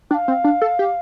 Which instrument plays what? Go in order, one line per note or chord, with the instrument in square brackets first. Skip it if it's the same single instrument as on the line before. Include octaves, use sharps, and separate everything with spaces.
[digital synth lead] D4 [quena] G5
[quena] F5
[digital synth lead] C4
D4
A4
G4